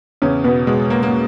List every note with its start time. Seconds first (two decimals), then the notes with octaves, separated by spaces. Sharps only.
0.22 E2 C#3 C#4
0.44 B2 B3
0.67 B2 G#3
0.90 A#3
1.03 A#3